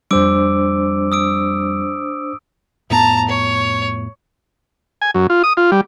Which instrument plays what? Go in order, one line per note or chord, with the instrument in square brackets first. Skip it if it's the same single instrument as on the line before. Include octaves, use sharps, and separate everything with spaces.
[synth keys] F2 G3 [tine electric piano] D4 C5 [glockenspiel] D6 E6 D7
[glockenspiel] D#6 E6 D7
[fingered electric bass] F2 A2 B3 [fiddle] A5 A#5
[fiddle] C#5
[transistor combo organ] G#5
F#2
F4
D#6
F4
G3